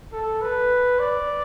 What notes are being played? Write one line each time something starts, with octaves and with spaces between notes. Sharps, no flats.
A4
B4
D5